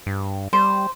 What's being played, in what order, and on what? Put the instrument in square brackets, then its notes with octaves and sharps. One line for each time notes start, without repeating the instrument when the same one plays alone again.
[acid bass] G2
[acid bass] G3 [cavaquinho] C5